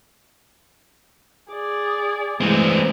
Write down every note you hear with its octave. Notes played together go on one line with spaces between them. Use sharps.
G#4 D5
E3 G#3 A3 C4